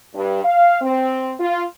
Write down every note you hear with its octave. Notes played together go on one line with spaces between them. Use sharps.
G2
F5
C4
F4